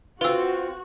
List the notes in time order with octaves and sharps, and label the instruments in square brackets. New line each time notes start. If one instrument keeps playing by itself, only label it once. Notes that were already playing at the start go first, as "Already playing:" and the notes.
[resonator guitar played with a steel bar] C4 F4 [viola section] F#4 [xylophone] B4 E6